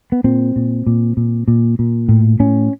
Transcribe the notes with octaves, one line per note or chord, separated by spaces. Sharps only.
B3
A#2 C4
A#2
A#2
A#2
A#2
A#2
A2
A2 C#4